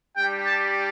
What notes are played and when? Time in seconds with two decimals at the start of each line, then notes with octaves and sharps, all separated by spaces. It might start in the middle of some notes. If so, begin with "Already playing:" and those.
0.16 G3 D4 G4 G5
0.45 A5